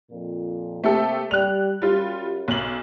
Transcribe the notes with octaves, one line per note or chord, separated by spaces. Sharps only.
F2 A#2
C3 A3 A#3 C4 G4 A4
G3 F#6 F7
F#2 G3 F4
B1 F#7